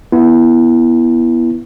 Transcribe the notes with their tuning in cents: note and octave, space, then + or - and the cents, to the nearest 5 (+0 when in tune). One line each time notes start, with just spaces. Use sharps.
B3 -10 E4 +10